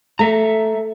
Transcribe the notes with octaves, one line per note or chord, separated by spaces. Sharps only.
A3 A4 E5 A#5